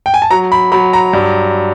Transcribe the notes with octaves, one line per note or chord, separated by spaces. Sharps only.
G5
G#5
A5
F#3 A#5
B5
F#3 B5
A#5
G2